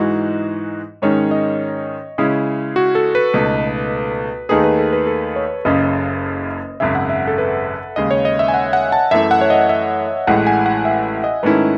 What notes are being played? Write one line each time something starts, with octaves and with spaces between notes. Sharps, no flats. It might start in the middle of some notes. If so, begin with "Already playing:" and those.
Already playing: G#2 E3 G#3 D#4 F#4
G#2 D#3 G#3 C#4 C#5
D#5
C#3 G#3 C#4 E4
F#4
A4
B4
C#2 B2 A3 D#4
D#2 D#3 A3 D#4 G#4 B4
B4
A4
B4
A4
C#5
F#1 F#2 C#3 D#5
G#1 F#2 C#3 E5
F#5
E5
A4
B4
D#2 C#3 G#3 D#5
C#5
D#5
E5
G#5
F#5
F#5
A5
F#2 E3 A3 E5
F#5
C#5
D#5
E5
A1 A2 E3 G#3 F#5
G#5
F#5
E5
D#5
G#2 D#3 A3 C#4 E4 B4